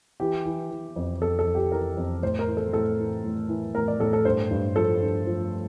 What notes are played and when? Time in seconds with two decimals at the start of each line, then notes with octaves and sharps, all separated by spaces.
0.20 E3 G4
0.45 E3
0.71 E3
0.96 F2
1.21 F2 A4
1.39 A4
1.47 F2
1.55 G4
1.72 E3 A#4
1.97 F2
2.22 A2 C5
2.39 A#4
2.48 E3
2.57 A4
2.73 A2 A4
2.99 E3
3.24 A2
3.49 E3
3.75 A2 A#4
3.88 D5
4.00 A2 A4
4.13 A4
4.25 G2 C5
4.51 G2
4.76 F3 A4
5.02 G2
5.26 F3